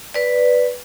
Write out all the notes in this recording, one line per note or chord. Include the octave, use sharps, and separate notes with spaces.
B4 D5